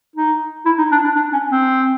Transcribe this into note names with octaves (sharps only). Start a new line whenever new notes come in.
D#4
E4
D#4
D4
D4
D4
C#4
C4